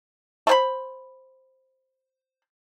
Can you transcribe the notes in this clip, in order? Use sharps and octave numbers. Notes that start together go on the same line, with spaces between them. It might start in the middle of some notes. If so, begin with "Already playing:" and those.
A3 C5 B5